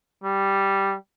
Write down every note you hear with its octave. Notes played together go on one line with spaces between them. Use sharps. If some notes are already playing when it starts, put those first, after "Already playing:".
G3